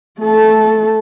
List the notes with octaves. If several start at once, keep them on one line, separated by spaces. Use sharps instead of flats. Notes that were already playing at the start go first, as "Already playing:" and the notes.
A3 A4